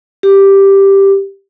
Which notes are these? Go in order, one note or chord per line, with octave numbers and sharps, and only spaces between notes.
G4